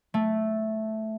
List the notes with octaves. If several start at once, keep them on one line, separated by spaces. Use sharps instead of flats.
A3